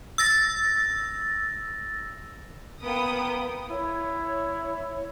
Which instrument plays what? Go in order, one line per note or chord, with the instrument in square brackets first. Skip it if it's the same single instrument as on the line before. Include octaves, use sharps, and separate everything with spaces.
[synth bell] E6 A6 A#6
[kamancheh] A#3 B4 [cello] B3 G5 [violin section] D#6
[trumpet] E4 [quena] C#5